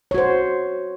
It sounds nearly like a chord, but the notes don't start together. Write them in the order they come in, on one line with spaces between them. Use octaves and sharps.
C#5 F#4 C5